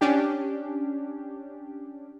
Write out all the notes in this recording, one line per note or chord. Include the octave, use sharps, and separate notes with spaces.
C#4 D4 G4